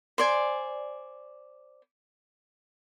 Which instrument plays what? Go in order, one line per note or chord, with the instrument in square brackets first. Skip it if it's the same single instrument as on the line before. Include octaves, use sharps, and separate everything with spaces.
[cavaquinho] C5 D5 G#5